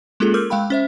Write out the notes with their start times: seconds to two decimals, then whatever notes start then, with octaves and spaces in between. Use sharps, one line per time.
0.20 G#3 A#3 C#4 F4 G#4 A4
0.34 A#4 D6 E6 F6 G6
0.50 G#3 F5 G5 B5
0.70 C#4 C5 E5